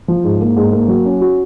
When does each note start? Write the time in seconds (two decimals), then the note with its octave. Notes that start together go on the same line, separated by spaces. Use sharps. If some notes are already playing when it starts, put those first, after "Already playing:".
0.08 F3
0.24 G#2
0.41 A#3
0.56 G#2
0.72 A#3
0.88 F#3
1.05 C#4
1.21 F#4